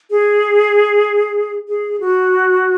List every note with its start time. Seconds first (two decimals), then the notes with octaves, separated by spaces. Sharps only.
0.10 G#4
1.68 G#4
2.00 F#4